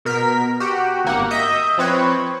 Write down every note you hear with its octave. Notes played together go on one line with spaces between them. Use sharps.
B2 A#4 B6
F#4 G4
G#1 A#3 F#5
D#5 E5 G6
F3 C4 B4 C#5